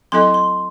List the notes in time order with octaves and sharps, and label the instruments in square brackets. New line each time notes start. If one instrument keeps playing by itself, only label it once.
[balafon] F#3 C4 E4 A4 D#5 [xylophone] C6
[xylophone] C6